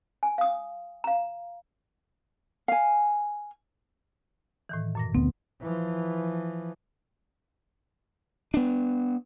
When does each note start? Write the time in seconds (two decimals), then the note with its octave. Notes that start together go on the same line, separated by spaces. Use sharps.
0.23 G#5
0.38 F5 D#6
1.04 F5 A#5
2.68 F5 G#5
4.69 A2 D#3 E3
4.95 F#2 A#2 A#6
5.15 D2 B3 C4
5.61 E3 F3
8.54 B3 D4